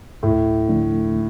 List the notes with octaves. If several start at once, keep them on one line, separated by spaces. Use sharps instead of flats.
D2 A2
D3 F3 A3 D4